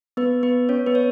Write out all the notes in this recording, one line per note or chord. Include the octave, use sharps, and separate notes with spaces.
B3 B4
B3 B4
C#4 C#5
B3 B4
C#5